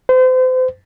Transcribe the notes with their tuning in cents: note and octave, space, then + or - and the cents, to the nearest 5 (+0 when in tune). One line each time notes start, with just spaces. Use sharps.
C5 -35